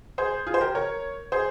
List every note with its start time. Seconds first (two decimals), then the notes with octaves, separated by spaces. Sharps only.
0.18 G#4 C5
0.46 F4 G#4
0.54 C5
0.61 G4 A#4
0.75 A#4 C#5
1.32 G#4 C5